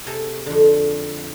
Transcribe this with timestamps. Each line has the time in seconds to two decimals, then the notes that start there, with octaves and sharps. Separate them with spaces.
0.06 C3 G#4 A4 A#5
0.46 F2 D3